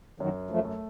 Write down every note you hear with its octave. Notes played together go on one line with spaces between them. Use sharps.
F#2 D#3 F#3
F3 A3
A3